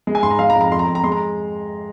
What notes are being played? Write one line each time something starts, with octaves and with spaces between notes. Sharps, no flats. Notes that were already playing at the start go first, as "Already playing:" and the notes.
G#3
G#5
G#2 C6
A#5
G#3 F5
A#5
F2
A#5
F2 C6
A#5
F2
A#5
G#3 C6
A#5